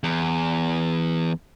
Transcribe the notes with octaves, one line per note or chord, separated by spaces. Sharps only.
E2